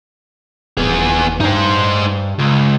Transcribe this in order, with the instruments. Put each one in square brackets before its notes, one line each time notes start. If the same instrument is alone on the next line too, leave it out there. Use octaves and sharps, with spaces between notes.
[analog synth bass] D#1 [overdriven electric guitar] B3 G#4
[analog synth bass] G2 [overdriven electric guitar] D#4 C5
[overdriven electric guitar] C#2